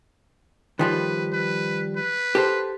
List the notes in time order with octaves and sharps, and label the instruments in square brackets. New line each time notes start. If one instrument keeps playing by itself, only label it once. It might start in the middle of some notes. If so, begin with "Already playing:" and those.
[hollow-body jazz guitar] D#3 F3 G3 [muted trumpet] B4
[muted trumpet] B4
B4
[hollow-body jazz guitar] G4 A4 C5